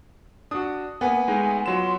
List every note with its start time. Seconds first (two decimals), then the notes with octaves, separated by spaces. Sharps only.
0.51 D4 F#4 D#6
1.01 A#3 B3 G#5
1.28 G#3 A3 D#4
1.66 F#3 F4 C6 E7